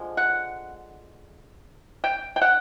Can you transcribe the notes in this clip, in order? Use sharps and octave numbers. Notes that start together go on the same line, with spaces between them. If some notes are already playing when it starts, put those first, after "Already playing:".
Already playing: D3 F3 G#3
F#5
G5
G5
F#5